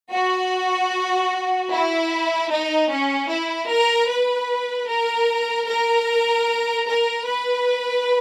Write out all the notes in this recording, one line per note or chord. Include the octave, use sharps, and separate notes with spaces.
F#4
E4
D#4
C#4
E4
A#4
B4
A#4
A#4
A#4
B4